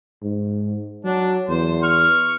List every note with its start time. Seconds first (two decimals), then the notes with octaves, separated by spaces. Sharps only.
0.23 G#2
1.05 F#3 D4
1.49 E2 C5
1.83 C#6 F6